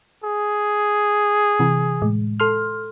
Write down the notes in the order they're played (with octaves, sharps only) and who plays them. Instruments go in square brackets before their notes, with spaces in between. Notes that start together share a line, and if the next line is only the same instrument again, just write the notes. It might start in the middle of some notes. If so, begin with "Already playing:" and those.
[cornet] G#4
[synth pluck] C3 E3
A2 G#3
A4 C6 F6